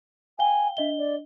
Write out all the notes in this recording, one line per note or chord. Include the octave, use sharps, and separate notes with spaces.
F5 G5 G#5 G7
D4 D#5 E5 G7
D5